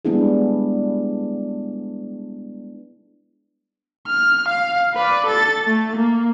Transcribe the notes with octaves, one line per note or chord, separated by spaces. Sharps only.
G3 G#3 B3 D4 E4 G#4
F6
F5
B4 D5
A4 A6
A3
A#3